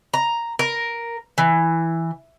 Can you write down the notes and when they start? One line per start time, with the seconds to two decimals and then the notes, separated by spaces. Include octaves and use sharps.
0.14 A#5
0.59 A#4
1.38 E3